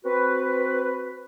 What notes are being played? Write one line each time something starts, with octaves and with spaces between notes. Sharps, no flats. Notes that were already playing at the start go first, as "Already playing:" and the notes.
C4 F#4 B4